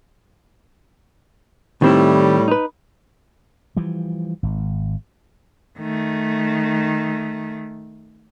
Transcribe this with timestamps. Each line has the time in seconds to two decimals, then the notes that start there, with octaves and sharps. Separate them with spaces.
1.82 A2 D#3 G3 C4 E4
2.48 D#4 B4
3.76 E3 F3 G3
4.43 G#1
5.78 D#3 A3